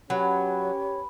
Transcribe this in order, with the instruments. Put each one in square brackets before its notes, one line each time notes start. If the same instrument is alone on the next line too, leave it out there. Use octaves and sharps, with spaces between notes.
[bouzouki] F#3 [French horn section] C#4 G4 [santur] B4 G#5 B5 [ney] C#5